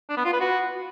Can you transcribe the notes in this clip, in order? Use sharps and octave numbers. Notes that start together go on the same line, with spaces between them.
D4
B3
F4
B4
F#4